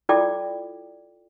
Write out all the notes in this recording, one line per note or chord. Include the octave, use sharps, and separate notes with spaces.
E4 F4 A4 D5 G5 D6